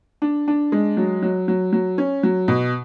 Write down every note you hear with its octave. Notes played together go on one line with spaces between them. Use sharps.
D4
D4
G#3
F#3
F#3
F#3
F#3
C#4
F#3
B2